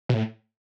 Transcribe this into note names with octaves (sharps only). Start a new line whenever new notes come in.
B2
A2